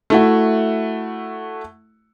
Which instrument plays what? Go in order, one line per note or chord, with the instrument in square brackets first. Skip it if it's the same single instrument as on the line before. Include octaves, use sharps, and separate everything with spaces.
[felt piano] A3 E4 F#4